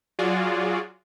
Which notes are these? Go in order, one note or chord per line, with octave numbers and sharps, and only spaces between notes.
F#3 F4 F#4 G#4 D5